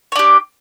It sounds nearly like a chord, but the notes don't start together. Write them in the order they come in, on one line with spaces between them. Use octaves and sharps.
C#5 D4 G4